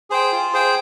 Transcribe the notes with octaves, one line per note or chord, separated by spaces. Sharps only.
G#4 C5 G5
F4
G#4 C5 G5